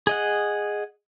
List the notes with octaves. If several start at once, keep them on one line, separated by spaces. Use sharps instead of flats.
G#4 D#5 F#5